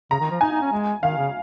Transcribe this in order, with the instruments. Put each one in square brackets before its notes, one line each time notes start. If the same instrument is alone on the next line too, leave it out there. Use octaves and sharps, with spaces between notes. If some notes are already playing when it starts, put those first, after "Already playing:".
[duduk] C#3 [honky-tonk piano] A#5
[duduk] D#3
F3
[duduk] D#4 [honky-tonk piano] G#5
[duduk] D#4
C#4
G#3
[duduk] D#3 [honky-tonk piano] F5
[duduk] C#3